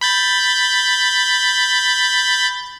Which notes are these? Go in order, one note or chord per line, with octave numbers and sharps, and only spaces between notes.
B5 G6 A6